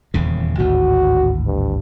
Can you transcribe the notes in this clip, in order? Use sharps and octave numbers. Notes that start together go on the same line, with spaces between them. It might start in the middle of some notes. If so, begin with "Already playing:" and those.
D#1 E2 C#3
G#1 D2 A2 F#4
G2